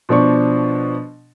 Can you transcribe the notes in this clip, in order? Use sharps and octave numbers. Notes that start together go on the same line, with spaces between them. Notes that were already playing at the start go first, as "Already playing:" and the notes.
B2 F3 D4 C#6